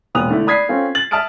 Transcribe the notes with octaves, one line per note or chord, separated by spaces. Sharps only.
E1 A#2 D#6 F#6 F7
D3 A3 E4
D5 B5 D#6 G#6 B6 C7
C4 C#4 F4 A4
A6 F#7
E5 A5 D#6 F6 A6 D7